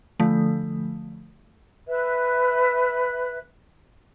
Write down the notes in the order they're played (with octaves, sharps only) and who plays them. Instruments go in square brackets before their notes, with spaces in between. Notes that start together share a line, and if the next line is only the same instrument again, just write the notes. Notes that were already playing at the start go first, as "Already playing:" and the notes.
[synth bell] D3 F3 A3
[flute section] B4 E5 F#6